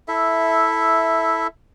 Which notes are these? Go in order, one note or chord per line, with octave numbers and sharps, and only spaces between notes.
E4 A4 E5